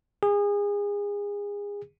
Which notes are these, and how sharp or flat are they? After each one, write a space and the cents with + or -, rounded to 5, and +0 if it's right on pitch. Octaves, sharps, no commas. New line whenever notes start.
G#4 -30